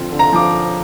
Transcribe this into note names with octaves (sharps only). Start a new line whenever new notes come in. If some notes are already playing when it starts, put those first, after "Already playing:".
Already playing: D3 F3 C4 F4
D3
A#5
F3 D6